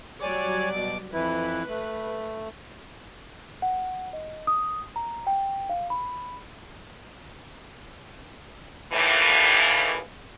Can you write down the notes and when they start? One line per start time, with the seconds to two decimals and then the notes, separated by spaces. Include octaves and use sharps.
0.22 F#3 G3 C#5 D5 G#5
0.72 B2 D6
1.13 F2 E3 E4 B4
1.68 A3
3.62 F#5
4.13 D#5
4.47 D#6
4.96 A#5
5.27 G5
5.69 F5
5.90 B5
8.92 D#2 A2 E3